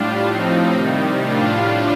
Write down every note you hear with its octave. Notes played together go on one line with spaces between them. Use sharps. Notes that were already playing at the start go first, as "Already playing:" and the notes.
Already playing: A2 G3 D4 F4
A2 F3 C4 D#4
C3 D#3 G3
A2 G3 D4 F4